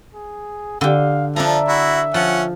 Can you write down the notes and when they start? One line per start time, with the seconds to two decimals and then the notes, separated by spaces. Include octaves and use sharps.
0.14 G#4
0.81 D3 G4 F5
1.36 F3 D4 A4 E5 A#5
1.68 E4 F#4
2.14 F3 C#4 F#5